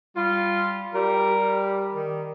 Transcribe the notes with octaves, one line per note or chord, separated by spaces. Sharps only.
G3 F4
G3 A#4
D#3